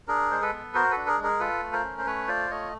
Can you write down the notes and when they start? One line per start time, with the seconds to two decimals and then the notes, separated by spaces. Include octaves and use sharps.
0.08 D4 G#4 A#4
0.31 G#3 C5
0.42 A4 B4
0.52 B3
0.74 F#4 A#4 C5
0.91 A4 B4
0.97 D4
1.07 G#4 A#4
1.18 G#3
1.23 G#4 A#4
1.40 F4 A4 B4
1.63 A3
1.73 A#4 C5
1.84 C#4
1.98 C5
2.06 A3 B4 C#5
2.28 F4 C5 D5
2.50 A3 C#5 D#5